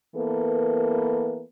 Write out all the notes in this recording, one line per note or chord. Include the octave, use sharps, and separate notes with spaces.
E3 A#3 B3 A4 A#4